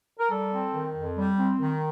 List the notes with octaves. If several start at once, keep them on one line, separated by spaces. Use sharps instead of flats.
A#4
G3 A4
C4
D#3
F2
G3
C4
D#3